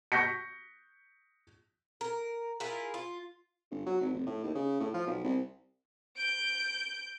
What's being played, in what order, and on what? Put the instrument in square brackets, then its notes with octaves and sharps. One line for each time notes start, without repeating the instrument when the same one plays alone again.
[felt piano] C#6 G6 A#6 B6 C#7
[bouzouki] A#4
E4 F4 G#4 A#4
F4
[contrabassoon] G1
F#3
G#1
F1
A2
D#2
C#3
A2
F3
B1
C2
[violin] G6 D7